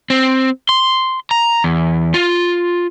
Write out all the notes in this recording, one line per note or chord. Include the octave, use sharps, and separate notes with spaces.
C4
C6
A#5
E2
F4